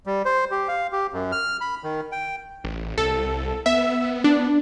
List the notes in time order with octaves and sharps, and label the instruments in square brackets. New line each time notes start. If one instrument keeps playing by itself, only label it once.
[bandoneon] G3
C5
G4
F5
G4
F#2
F6
B5
D#3
G5
[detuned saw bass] A1
[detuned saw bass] C2 [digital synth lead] A4
[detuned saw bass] B3 [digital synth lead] E5
[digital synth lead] D4